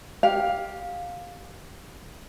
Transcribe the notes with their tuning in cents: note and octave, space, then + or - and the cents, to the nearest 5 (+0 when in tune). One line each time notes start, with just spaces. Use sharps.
G4 +0 F5 +15